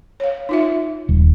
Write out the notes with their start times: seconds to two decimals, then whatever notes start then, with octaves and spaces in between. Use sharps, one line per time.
0.20 C#5 F5
0.49 D#4 F4 E5
1.09 D#1